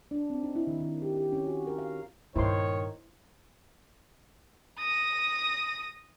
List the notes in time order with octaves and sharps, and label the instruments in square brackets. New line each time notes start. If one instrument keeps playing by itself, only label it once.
[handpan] D4
C4
D#4
E4
D#3
D#3
G4
G4
C#4
F#4
A#4
F5
[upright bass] G2 A#2 [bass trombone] D#3 [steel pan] E4 C5 C6 [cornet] C#5
[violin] D#6 A#6